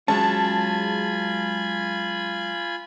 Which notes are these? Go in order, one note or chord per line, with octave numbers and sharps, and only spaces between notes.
F#3 G#3 C#4 F4 G#5 A5 B5